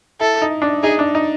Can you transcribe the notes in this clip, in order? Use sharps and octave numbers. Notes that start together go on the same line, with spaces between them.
E4 A4
D#4
D4
D#4 G#4
D4
D#4